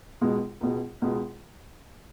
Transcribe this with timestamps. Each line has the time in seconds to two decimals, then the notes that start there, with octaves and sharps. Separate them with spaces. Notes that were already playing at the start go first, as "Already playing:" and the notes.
0.21 C#2 B2 G#3
0.61 C#2 B2 G#3
1.02 C#2 B2 G#3